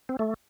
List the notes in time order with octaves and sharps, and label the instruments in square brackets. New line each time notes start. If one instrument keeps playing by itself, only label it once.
[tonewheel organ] C4
A3